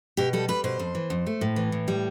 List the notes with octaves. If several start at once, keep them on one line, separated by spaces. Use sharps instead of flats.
B2 G4
G3 A4
G3 B4
B2 C5
F2
E3
F2
A3
A2
E3
A2
G3